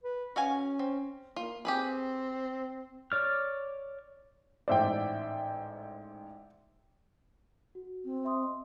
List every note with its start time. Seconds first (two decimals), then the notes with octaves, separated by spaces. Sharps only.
0.03 B4
0.36 C#4 F#4 F5 G#5
0.79 C4
1.36 A#3 F4
1.65 C4 G4 G#4 B4
3.12 C#5 D5 F6
4.68 A1 G#2 C5 D5 E5 G5
7.75 F#4
8.05 C4
8.25 E5 C6 D#6
8.42 D#5 C6